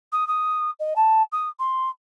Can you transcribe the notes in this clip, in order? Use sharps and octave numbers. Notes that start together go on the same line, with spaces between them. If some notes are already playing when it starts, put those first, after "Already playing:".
D#6
D#6
D#5
A5
D#6
C6